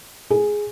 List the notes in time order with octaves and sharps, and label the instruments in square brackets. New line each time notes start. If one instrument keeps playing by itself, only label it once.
[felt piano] G#4